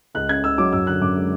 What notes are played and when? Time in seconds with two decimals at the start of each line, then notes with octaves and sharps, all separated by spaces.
0.15 C#2 F#6
0.29 C#3 G#6
0.44 C#2 E6
0.58 F#3 D6
0.73 F#2 E6
0.86 D3 F#6
1.01 F#2 D6
1.16 G#3